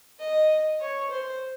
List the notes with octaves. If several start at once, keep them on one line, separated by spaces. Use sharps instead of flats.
D#5
C#5
C5